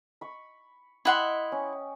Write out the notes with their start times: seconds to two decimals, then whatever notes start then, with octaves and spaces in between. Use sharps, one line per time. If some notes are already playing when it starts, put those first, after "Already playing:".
0.21 B5 C#6
1.05 E4 D#5 F#5 G5 C6
1.52 C#4